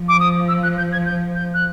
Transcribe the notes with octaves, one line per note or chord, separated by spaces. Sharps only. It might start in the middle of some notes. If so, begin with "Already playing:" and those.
Already playing: F3
D6
D#6
E6
F#6
G6
G#6
G6
G6
F#6